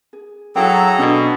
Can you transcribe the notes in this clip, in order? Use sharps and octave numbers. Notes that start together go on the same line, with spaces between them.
G#4
F#3 E4 G#4 A4 F5 G5 A#5
B2 D4